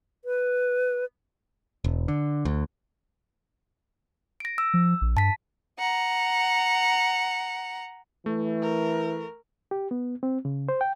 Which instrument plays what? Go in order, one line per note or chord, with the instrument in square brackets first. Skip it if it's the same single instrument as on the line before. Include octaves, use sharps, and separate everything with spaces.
[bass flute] B4
[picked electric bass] E1
D3
D2
[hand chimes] A#6 D7
E6
[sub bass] F3
A#1
[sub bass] G2 [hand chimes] A5 B6
[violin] F#5 A#5
[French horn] E3 [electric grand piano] A3
[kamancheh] A#4
[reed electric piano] G4
B3
C4
C#3
C5
G5